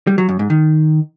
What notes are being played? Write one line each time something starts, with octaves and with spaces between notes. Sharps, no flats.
G3
F#3
F#2
G#2
D#3